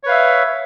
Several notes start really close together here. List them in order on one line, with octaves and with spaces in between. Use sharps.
C#5 B4 F5 E5